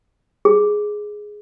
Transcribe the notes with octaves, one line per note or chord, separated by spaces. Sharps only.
G#4